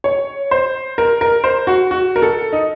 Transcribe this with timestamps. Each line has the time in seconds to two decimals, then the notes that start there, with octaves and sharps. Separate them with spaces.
0.04 C#5
0.51 C5
0.98 A#4
1.21 A#4
1.44 C5
1.67 F#4
1.91 F#4
2.16 A#4
2.22 A4
2.53 D#4